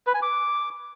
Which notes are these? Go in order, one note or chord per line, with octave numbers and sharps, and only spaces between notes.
B4
G#5
D6